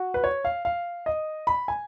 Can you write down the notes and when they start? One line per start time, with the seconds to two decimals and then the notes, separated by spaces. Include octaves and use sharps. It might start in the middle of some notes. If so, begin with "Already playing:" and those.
Already playing: F#4
0.14 B4
0.24 C#5
0.45 F5
0.65 F5
1.06 D#5
1.47 B5
1.68 G#5